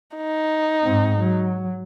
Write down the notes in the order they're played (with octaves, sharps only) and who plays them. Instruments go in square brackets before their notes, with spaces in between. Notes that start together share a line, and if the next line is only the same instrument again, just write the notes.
[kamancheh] D#4
[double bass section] G#2 C4
F#3